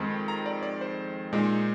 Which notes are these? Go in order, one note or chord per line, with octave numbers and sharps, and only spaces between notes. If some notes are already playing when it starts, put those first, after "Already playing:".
Already playing: F2 D#3 G#3 C4
A#5
D5
D5
C5
A#2 G#3 D#4